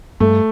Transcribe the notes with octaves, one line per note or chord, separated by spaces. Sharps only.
G2 A3